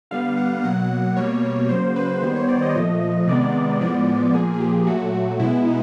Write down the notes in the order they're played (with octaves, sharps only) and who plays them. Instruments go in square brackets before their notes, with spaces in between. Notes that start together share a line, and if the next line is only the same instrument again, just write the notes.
[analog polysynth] D3 G3 B3 F5
F#5
B2 F#3 A#3 F#5
B2 G3 A#3 C#5
C#3 F#3 A#3 C5
B4
D#3 G3 B3 C5
C#5
D5
D#5
A#2 F3 A3 D#5
C3 D#3 G#3 B3 D5
A2 F3 G#3 B3 D5
A#2 F3 A#3 G#4
G#4
G4
A#2 F#3 A3 F#4
F#4
B2 G#3 B3 E4
D#4